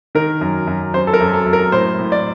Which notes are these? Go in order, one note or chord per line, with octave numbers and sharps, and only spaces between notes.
D#3 A#4
F#2
F#2
F#2 C5
A4
A#4
F#2
A4
F#2
A#4
A2 C5
A2
D5